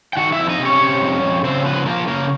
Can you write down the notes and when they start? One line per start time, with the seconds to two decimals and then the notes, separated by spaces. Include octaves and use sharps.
0.13 G5
0.17 D#3 F#4 F#5
0.32 E4 E5
0.39 F2
0.49 D#4 D#5
0.59 C3
0.65 C#4 C#5
0.81 C3
1.02 F2
1.22 F2
1.44 C#3 C4 C5
1.65 F3 B3 B4
1.86 F3 A#3 A#4
2.07 C#3 A#3 A#4